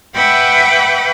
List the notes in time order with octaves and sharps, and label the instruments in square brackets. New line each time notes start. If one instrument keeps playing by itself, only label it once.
[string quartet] B4 E5 F#5 G5 B5 D6